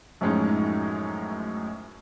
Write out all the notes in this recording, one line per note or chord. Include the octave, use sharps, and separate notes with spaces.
F#2 A2 F3 G#3 C#4 D#4